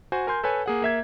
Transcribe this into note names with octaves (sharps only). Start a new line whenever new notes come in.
F#4 C5 G#5
A#4 G#5 C6 G6
A4 B4 C#5 G#5
A#3 G#4 F#5
A#3 E5 G#6